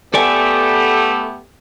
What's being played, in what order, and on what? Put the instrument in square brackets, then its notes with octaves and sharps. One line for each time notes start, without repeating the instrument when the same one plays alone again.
[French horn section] A3 B3 [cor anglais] G4 [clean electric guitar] A4 D5 G#5